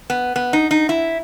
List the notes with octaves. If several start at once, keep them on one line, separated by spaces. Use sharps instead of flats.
B3
B3
D#4
D#4
E4